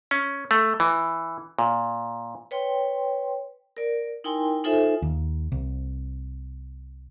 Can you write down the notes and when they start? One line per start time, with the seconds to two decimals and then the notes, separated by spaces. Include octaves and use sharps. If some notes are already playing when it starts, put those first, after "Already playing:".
0.11 C#4
0.51 A3
0.80 E3
1.59 A#2
2.51 B4 C#5 G5 C6
3.77 A#4 D5
4.24 D#4 E4 A#4 G5 G#5 C6
4.64 D#4 F4 A4 C5 E5 G#5
5.02 D#2
5.52 C2